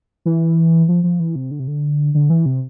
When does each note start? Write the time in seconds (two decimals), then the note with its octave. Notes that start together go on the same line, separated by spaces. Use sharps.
0.25 E3
0.88 F3
1.04 F3
1.20 E3
1.35 C3
1.51 D3
1.60 C3
1.68 D3
2.15 D3
2.30 E3
2.46 C3